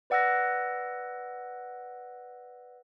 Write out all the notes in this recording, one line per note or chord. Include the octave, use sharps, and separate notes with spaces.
B4 D5 F#5 E6 F#6 A#6